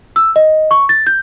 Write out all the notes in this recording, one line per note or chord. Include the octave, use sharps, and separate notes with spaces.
E6
D#5
C#6
A6
G6